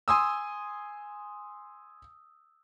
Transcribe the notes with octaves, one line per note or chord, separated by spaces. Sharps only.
G#5 C6 D#6 E6